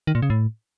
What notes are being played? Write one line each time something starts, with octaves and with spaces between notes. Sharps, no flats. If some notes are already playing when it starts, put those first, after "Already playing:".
D#3
A#2
C#3
A2